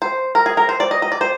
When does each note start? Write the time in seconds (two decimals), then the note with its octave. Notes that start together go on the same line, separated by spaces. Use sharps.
0.02 C5
0.35 A#4
0.46 G#4
0.57 A#4
0.69 C5
0.80 D5
0.91 D#5
1.02 D#5
1.12 D5
1.21 C5